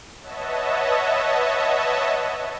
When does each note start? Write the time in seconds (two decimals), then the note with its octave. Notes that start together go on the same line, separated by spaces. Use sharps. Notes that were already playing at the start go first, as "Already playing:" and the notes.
0.20 B4 C#5 D#5 E5 F#5 A5